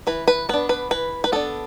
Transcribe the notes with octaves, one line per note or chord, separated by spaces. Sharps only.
E3 B4
B4
B3 D4 B4
B4
E3 B4
B4
B3 D4 A4